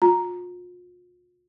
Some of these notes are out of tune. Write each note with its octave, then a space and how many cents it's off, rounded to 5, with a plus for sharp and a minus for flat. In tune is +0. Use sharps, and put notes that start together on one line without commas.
F4 +40 A#5 +0